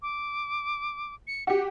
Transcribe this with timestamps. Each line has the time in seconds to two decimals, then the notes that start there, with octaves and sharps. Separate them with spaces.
0.02 D6
1.27 C#7
1.47 F#4 G4 C#7